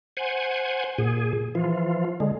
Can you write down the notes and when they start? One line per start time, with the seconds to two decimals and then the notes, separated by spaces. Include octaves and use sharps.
0.17 C5 F#5 G#5
0.98 A#2 G#4
1.55 E3 F3 F4
2.20 D3 G#3